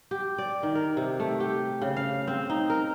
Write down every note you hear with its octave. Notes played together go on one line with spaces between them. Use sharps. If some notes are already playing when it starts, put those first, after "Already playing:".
G4
D5
D#3
A#4
C3
A3
G4
C#3
F5
C4
D#4
A#4